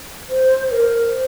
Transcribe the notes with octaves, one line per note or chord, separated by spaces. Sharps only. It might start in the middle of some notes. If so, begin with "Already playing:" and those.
C5
C5
A#4
C5